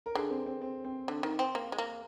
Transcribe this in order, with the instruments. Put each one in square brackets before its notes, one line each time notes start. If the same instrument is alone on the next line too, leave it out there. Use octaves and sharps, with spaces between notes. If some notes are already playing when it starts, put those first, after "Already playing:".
[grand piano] A#4
[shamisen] D3 [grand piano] G#4
[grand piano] C4
C4
C4
C4
[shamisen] D3
D#3
C4
A#3
G#3
A#3